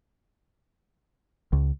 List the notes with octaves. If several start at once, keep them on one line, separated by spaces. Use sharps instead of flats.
C#2